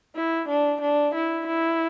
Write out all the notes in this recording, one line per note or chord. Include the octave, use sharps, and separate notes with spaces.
E4
D4
D4
E4
E4